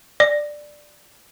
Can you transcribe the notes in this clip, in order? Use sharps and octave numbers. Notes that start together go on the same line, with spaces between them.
D5